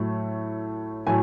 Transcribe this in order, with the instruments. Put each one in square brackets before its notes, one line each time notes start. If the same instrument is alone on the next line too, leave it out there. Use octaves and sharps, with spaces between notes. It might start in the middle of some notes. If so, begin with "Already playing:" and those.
Already playing: [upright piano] A2 F#3 A3
A2 F#3 A3 G#5